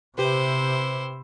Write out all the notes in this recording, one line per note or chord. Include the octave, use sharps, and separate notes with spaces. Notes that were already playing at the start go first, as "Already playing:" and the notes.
C3 E4 G4 B4 C5